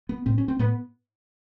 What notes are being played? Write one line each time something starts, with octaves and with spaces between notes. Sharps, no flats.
B3
A2 C4
C#4
C4
A2 B3